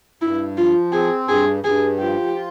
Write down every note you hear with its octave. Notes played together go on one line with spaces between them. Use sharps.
G2 E4
F3 F4
C4 G#4
G2 G#4
G2 G#4
F3 G4
F4